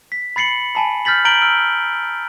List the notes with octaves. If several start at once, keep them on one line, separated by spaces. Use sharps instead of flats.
B6
B5 A6 C7 C#7 F#7
G#5 A5 B5
F6 G6 A6 B6 F#7
A#5 G6 A6 D7 F#7 G7
E6 F6 D7